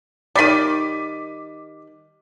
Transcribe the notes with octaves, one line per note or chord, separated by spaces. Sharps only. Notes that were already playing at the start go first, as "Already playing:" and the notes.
D#3 G3 D6 B6 D#7